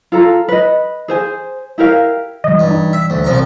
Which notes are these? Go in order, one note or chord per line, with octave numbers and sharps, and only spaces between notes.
F4 A4 A#5
B4 D#5
G#4 C5 G#5
E4 G4 A#4 F5
E3 G3 D#5
G2
D#4
E5
D2
C2 F3 A#5